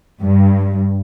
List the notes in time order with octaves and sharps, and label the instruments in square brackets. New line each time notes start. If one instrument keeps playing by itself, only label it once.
[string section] G2